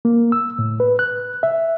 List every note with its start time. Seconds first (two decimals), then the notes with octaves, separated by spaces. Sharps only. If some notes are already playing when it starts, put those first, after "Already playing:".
0.05 A#3
0.32 E6
0.59 A2
0.80 B4
0.99 F#6
1.43 E5